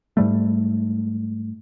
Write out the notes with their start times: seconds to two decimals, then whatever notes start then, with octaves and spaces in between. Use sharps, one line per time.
0.17 G#2 G3 A3